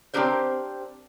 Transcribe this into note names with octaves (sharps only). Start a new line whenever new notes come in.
C4 D4 D#4 G4 A#4 C5